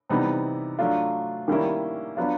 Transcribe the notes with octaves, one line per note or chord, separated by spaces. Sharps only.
C3 E3 G3 B3 D#4
F#3 A3 D4 F4
D#3 G3 A#3 C#4 E4
F#3 B3 D4 F4